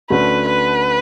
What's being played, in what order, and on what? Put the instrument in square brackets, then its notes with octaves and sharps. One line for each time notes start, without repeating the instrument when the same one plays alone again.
[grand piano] D2 D3 A3 C#4 [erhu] B4
[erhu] B4